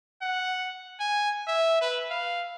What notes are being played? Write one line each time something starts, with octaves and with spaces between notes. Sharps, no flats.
F#5
G#5
E5
B4
F5